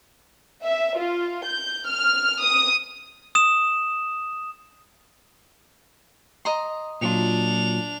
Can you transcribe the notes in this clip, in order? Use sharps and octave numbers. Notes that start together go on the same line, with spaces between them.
E5
F4
G6
F6
D#6
D#6 E7
D#5 A#5 C6
A#2 F#3 D4 F4 F7